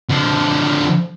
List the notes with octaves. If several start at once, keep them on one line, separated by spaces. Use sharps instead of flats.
D3 F3